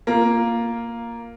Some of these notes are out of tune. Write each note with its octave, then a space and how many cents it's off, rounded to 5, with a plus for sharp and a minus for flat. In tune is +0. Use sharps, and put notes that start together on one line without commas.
A#3 +0 F4 +0